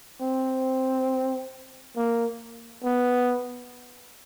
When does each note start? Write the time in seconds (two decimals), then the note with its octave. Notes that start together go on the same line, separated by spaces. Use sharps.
0.21 C4
1.96 A#3
2.84 B3